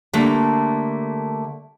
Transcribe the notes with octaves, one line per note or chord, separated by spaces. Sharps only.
D3 G3 A3 A#3